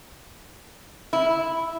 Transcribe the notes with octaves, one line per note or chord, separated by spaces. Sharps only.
E4